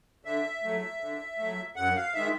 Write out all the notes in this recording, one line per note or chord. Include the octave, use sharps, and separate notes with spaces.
D3 E5
F#3 A3
D3
A3
F#3
F#2 F#5
F5
D#3 G#3 E5